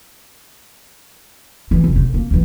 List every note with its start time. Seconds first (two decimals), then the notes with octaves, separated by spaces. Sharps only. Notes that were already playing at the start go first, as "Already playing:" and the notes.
1.71 E3
1.84 F1
1.96 G#2
2.14 A#3
2.31 B1 E3